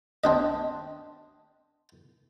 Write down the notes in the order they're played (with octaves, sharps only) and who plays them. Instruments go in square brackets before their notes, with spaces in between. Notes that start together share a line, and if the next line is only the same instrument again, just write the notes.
[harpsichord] C4 D4 D#5